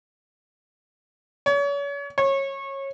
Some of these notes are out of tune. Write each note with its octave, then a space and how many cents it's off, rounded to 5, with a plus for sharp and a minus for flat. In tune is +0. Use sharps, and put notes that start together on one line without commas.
C#5 +40
C#5 -20